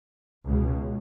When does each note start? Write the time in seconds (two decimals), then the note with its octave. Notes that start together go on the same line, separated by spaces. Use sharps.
0.45 C#2 B2